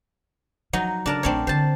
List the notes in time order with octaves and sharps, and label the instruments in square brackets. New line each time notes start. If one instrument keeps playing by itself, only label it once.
[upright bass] F3 [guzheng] F#3 D#4
[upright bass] C#3 G#3 [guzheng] D4 A#4 A5
[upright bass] A#1 A3 [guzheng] C4 D4 C#5
[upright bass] D3 E3 [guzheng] C5 A5